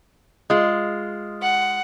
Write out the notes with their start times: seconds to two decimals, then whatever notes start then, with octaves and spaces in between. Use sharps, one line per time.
0.50 G#3 F4
1.42 F#5